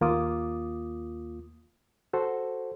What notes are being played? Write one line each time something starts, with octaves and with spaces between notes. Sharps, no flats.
D#2 A#3 F4 D6 D#6
F#4 A4 C5